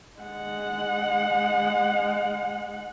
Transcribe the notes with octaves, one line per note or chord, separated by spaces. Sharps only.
G#3 F#5